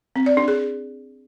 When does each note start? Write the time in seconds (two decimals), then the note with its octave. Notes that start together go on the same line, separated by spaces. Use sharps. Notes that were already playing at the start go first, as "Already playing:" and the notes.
0.16 C4
0.26 D5
0.37 D4
0.48 G#4